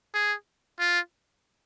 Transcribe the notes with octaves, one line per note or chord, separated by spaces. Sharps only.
G#4
F4